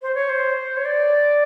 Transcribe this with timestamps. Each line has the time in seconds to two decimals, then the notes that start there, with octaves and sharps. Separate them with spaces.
0.02 C5
0.15 C#5
0.29 C5
0.77 C#5
0.85 D5